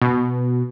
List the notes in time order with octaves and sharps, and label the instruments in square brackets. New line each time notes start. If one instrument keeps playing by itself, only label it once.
[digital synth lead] B2